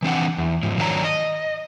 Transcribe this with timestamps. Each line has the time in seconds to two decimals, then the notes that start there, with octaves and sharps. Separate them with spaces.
0.03 E3 C4 D4 F#5
0.38 E2
0.63 G#2 F3
0.78 D#3 F#3 D4 C#5 E5 A#5
1.04 D#5